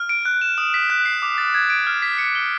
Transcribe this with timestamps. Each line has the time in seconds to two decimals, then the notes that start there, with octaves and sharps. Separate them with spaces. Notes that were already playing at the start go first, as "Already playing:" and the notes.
Already playing: F6
0.09 D7
0.25 F#6
0.41 E7
0.58 D#6
0.74 B6
0.90 F#6
1.05 C7
1.22 D6
1.38 A6
1.54 G#6
1.70 D7
1.87 F6
2.02 B6
2.18 C#7
2.35 G7